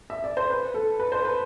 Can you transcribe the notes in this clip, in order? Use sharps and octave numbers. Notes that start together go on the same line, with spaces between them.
E5
D5
C5
B4
A4
B4
C5
B4